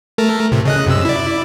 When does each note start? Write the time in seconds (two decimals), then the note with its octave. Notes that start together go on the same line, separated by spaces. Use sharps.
0.18 A3 A4 A#4
0.52 A2 C3
0.65 C#3 D#5 F#6
0.87 F#2 C3 E6
1.05 E4 D5